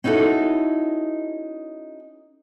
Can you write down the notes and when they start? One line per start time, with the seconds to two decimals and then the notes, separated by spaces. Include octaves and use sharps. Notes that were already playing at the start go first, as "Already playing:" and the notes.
0.04 C#4 D#4 E4 F#4 A4